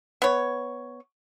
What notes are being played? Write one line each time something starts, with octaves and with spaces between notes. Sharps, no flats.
B3 C#5